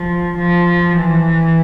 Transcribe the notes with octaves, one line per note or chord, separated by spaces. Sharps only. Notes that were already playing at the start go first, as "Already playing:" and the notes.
Already playing: F3
F3
E3